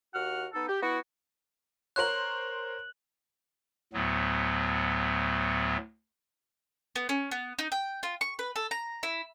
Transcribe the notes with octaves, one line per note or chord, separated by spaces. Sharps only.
D#2 F#4 F#5 F6
B3 D#4 A4
G4
B3 E4 F#4
A#4 C5 C#5 F#6 F#7
D2 A2 F#3 B3
B3
C#4
B3
D#4
G5
F4
C#6
B4
A4
A#5
E4